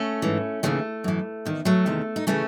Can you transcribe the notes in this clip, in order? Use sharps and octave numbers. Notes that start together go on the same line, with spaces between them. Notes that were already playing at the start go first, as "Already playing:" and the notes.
Already playing: A3 C#4
G#2 E3
D#2 C#3 E3 F#3 A3
F#2 E3
E2 D#3
F#3 A3
E2 C3 D#3
D#4
C#3 E3 A3 C#4